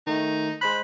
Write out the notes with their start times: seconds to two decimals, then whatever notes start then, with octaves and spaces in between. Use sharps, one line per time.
0.07 D#3 A3 D#4
0.61 G#3 C5 B5 F#6